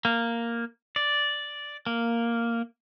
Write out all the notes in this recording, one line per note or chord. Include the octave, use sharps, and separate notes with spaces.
A#3
D5
A#3